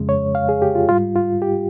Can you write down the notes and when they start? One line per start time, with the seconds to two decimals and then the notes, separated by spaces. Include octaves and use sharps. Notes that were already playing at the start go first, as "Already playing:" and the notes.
Already playing: F2 C#3 G#3
0.09 C#5
0.35 F5
0.49 G#4
0.62 G4
0.75 F4
0.89 G#2 G3 F4
1.16 F4
1.42 G4